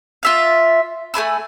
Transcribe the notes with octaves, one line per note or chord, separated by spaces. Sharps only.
F4 E5 F5
A3 G#5 B5 E6